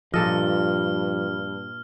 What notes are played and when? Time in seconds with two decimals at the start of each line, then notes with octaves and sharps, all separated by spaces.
0.14 G2 A#2 F3 A4 D#5 F6